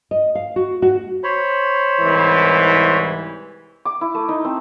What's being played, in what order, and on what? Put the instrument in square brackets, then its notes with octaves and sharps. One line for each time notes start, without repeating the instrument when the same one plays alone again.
[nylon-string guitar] D#5
F5
F#4
F#4
[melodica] C5 C#5 B5
[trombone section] C2 G#2 E3
[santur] D6
E4
A3
D#4
C4